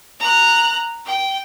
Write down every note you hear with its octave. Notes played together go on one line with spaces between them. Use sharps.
A#5 F#6
G5